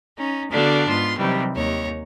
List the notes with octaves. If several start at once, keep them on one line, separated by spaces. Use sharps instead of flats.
C#4 D#4
D3 B3 D4 F#4 F5
G#2 B3 F4 C6
C3 D#3 E3 F#3 G3
D#2 C#5 A#5